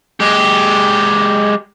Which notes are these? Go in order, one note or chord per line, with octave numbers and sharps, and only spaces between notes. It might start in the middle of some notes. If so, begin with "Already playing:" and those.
G#3 G4